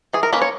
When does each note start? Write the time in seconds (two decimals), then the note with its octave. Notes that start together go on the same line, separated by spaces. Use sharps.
0.13 E3 G#4
0.23 A#4
0.33 A#3 C#4 B4
0.42 C#5